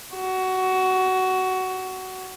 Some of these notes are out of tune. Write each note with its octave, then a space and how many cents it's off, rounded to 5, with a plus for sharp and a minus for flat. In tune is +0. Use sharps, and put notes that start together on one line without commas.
F#4 +15